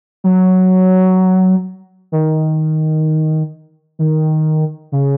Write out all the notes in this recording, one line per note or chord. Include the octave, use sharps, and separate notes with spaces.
F#3
D#3
D#3
C#3